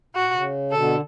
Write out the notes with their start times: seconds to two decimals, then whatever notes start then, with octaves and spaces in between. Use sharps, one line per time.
0.15 A2 F#4
0.25 B2
0.34 C#3
0.71 B2 D3 A4